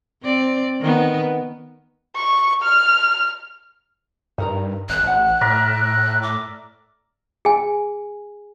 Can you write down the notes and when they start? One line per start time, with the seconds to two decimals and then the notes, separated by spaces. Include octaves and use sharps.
0.23 C4 D5
0.80 D#3 B3
2.16 C#6
2.63 F6
4.38 G2 D#4 A#4 A#5
4.89 G#1 F#6
5.03 A1 F#5 A5
5.41 A2 A#4 D5 E5
6.23 D6
7.45 G#4 G#5